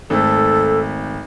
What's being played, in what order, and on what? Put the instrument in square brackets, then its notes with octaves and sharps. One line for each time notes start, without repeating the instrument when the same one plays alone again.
[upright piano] G#1 A3 [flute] A4